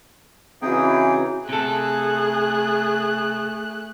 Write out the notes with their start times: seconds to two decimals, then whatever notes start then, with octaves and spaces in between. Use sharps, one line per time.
0.62 C#3 E3 C4 D#4 F#4 G#4 G5
1.49 C3 A3 G#4 A4 F#6